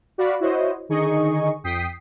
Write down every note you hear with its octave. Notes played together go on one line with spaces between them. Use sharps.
F#4 D5 F5 B5
E4 F#4 C5 C#5 D#5
D3 D#3 D#4 G#4 D#5 C#6
F2 G5 D#6 B6 C7